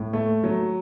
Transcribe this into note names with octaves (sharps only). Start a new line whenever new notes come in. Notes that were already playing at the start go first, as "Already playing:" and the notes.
Already playing: A2
A3
F#3